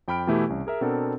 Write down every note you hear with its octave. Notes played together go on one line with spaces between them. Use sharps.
F2 G5 B5 F6 D7
B2 E3 A3 E4 G4
C2 C#4
G#4 A#4 E5
B2 B3 C4 D4 A4 A#4